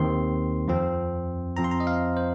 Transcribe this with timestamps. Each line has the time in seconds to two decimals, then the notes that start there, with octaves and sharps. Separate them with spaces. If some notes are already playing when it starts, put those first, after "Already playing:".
Already playing: D#2 D#3 C4 C6
0.68 F2 F3 C4
1.57 F2 F3 C4 A#5
1.64 C6
1.71 A#5
1.80 D#5
1.87 F5
2.17 C5